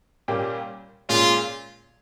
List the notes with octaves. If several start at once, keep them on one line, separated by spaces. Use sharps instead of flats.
A#2 G3 A#3 C#4 G4
A#2 G#3 C#4 F4